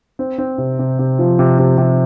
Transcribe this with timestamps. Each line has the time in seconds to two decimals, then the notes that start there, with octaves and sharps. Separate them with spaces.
0.19 C4
0.38 C4
0.58 C3
0.79 C3
0.99 C3
1.19 F3
1.39 C3
1.59 C3
1.78 C3